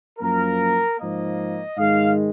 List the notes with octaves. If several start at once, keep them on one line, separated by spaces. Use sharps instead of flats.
F#2 F3 A#3 A#4
G#2 F3 A#3 D#5
G#2 D#3 G#3 F5